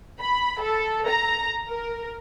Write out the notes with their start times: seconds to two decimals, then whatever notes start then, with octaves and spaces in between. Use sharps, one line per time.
0.21 B5
0.62 A4
1.08 A#5
1.69 A#4